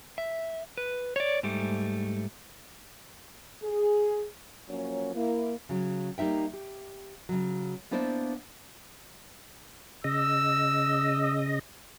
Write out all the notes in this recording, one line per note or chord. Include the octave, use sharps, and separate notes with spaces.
E5
B4
C#5 D5
G#2 G3 A3
G#4
F3 F#3 A#3 C#4 C#5
A#3 E4
C#3 F#3
G3 A#3 D#4 E5 G5
G4
C#3 F#3
A#3 B3 D4 E4 C5 D5
C#3 D#5 E6